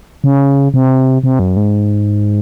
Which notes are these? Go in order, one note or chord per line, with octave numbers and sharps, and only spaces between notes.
C#3
C3
C3
F#2
G#2